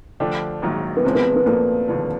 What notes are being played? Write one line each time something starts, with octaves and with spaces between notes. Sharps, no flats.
D3 F3 A3 D4 G4
A#1 G#2 D#3 F#3 A#3
B3
F#1 E2 C3 F3 G#3 C4
B3
B3
A#2 F3 A3 A#3
E1 D#2 D3 F3